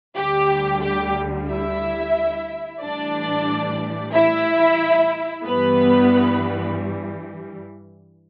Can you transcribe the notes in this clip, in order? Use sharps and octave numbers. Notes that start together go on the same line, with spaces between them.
D2 D3 G3 G4
G4
E4 E5
A2 E3 G3 D4 D5
E4 E5
G2 E3 G3 B3 B4